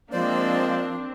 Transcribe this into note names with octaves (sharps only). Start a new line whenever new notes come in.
F3 G#3 A#3 C4 D4 C5 D5